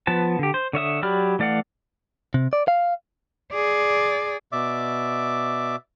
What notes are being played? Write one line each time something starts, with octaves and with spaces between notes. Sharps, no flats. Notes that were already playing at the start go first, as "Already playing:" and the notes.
F3 B3 B4 A5
D3 G4
C5
D3 C#5 E5 D#6
F#3 G4 D5 B5 F6
E3 A3 D5 F5 F#5
C3
D5
F5
G#4 D5
B2 D5 E5 D6